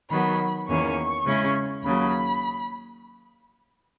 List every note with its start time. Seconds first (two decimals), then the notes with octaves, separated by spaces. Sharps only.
0.10 D#3 F#3 B3 B5
0.68 E2 D#3 A#3 C#4 C#6
1.26 C#3 G#3 C#4 E4
1.83 D#2 C#3 F#3 B5